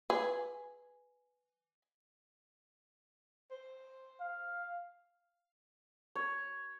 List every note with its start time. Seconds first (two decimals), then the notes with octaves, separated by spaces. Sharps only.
0.10 G#4 B4
3.51 C5
4.21 F5
6.15 C#5